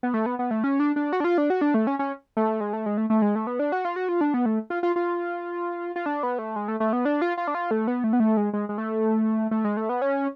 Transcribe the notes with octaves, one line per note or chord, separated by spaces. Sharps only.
B3
A3
B3
B3
A3
C#4
D4
D4
F#4
D4
F4
D4
F#4
D4
A3
C#4
C#4
A3
G#3
A3
G#3
A3
A3
G#3
A3
B3
D4
F#4
F4
F#4
F4
D4
B3
A3
F4
F4
F4
F4
D4
B3
A3
G#3
A3
A3
B3
D4
F4
F4
D4
F4
A3
B3
A3
B3
A3
G#3
G#3
G#3
A3
A3
G#3
A3
B3
C#4